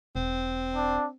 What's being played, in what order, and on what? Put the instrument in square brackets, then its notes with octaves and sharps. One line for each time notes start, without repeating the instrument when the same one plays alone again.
[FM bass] E1 [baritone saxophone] C4
[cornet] D4